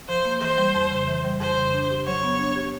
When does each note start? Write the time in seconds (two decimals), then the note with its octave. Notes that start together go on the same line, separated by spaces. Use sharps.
0.09 F3 C5
0.25 A#3
0.41 E3 C5
0.58 G3
0.75 F2
0.91 C#3
1.08 E3
1.25 G3
1.41 F2 C5
1.58 C#3
1.74 D4
1.90 G4
2.06 F#3 C#5
2.23 B3
2.39 D4
2.56 G4